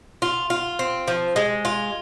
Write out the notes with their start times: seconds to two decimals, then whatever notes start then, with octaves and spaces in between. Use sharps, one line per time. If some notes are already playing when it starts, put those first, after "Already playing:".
0.22 F4
0.50 F4
0.79 C4
1.08 F3
1.36 G#3
1.65 F4